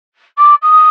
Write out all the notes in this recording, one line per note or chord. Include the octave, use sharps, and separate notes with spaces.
D6
D#6